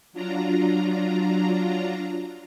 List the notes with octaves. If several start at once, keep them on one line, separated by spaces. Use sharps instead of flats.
F#3 D4 F4 A#5